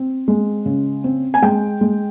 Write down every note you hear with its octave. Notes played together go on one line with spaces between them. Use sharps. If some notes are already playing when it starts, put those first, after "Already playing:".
Already playing: C4
G#3
C#3
C4
G#5
G#3 G5
G#3